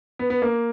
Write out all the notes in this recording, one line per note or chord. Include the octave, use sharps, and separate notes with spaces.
B3
B3
A#3